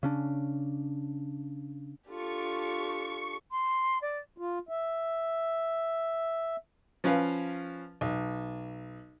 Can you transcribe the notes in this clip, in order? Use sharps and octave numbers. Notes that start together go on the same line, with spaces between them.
C#3 C#4 D4
D4 F4 G4 A4 C#6
C6
D5
F4
E5
F3 C#4 B4 F5
B1